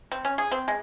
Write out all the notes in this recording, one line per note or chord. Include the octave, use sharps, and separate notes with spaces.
C4
C#4
G#4
C4
G#3